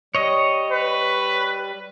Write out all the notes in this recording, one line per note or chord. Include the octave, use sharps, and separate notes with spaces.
G3 C#5 D#5
B4